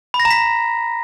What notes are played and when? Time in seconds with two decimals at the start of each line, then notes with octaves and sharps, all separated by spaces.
0.14 B5
0.20 A#6
0.25 A#5
0.30 B6